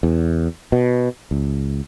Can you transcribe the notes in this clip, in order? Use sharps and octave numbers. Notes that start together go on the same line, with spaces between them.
E2
B2
C#2